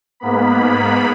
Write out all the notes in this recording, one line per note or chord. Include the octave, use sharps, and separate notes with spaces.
G#2 A#3 B3 B5